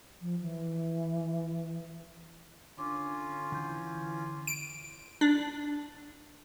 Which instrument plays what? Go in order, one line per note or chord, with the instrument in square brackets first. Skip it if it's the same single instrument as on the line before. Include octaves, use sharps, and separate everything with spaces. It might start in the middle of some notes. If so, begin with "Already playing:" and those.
[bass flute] F3
E3
[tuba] D3 [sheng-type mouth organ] C#4 F4 [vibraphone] C6 D6
[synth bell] D3 G6 [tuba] E3
[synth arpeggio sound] D7
D4